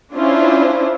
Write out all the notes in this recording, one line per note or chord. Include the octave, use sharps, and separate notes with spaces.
C#4 D4 E4 F4 C5